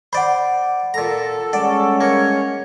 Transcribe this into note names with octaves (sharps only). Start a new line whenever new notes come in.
C5 D5 F#5 B5
A#2 A4 A#5
G3 G#3 C#4 D5 F#5
A#3 C#5